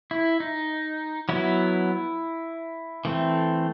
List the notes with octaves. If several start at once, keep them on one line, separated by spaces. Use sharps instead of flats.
E4
D#4
F#3 B3 E4
E3 A3 C4